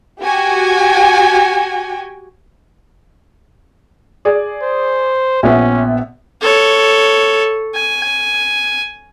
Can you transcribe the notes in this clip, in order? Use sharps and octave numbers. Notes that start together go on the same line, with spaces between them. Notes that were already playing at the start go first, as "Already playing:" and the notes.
F#4 G4 G5 G#5
G#4 D5
C5
A#1 B3 C#4 E5
A4 C#5
G#5